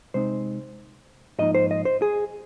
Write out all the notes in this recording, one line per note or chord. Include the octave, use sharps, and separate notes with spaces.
C3 G#3 C4 D#4 C5
G#2 F3 A#3 D#4 D#5
C5
D#5
C5
G#4